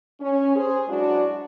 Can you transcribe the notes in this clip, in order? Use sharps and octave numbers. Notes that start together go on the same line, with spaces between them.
C#4
G#4 C5
F#3 G#3 D4 E4 F#4